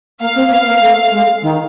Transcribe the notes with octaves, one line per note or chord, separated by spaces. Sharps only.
A#3 F5
C4
B3 F5
A#3
A3
G#3
D#3